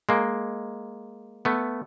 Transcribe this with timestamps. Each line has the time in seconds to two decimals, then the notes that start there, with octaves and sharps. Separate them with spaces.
0.09 G#3 A#3
1.45 A3 B3